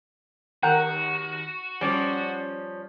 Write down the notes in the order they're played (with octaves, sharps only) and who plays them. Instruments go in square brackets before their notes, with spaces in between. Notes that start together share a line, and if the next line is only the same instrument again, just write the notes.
[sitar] D#2 [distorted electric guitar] F#4 [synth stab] A#4 F#5 G5
[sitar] F3 C#4 [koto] G3 D5